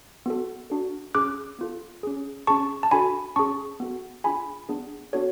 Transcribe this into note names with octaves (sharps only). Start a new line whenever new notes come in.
B3 F#4 A4
D4 F#4 A4
C#4 G#4 D6 F#6
B3 F4 A4
C#4 G#4
C#4 G#4 A5 C#6
A5
D4 F#4 A4 G#5 B5
C#4 G#4 A5 C#6
B3 F#4 A4
D4 F4 G#4 G#5 B5
B3 D4 G#4
B3 D4 F#4 A4 C#5